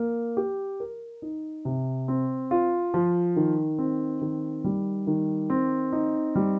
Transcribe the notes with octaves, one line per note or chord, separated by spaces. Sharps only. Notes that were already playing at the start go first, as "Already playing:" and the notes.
Already playing: A#3
G4
A#4
D#4
C3
C4
F4
F3
D#3
C4
D#3
G3
D#3
C4
D#4
G3